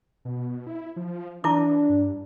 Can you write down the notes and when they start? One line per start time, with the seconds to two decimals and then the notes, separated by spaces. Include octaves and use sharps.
0.25 B2
0.67 E4
0.96 F3
1.44 E3 D4 E4 A5 D6
1.89 G2